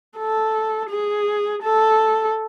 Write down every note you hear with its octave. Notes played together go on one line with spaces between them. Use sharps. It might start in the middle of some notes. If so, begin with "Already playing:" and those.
A4
G#4
A4